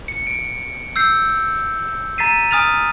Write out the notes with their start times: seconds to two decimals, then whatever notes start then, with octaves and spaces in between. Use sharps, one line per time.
0.08 C#7
0.27 D7
0.96 E6 G6 C7
2.18 A#5 A6 B6 C7 D#7
2.51 G#5 D#6 F6 A6 F7